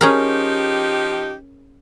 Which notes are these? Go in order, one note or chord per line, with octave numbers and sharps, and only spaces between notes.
F3 C#4 D#4 G4 G#4 A#4